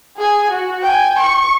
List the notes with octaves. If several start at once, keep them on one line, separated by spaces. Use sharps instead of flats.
G#4 G#5
F#4
G5 G#5
C#6